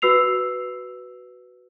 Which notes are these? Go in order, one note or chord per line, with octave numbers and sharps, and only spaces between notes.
F#4 B4 E6 C7 F7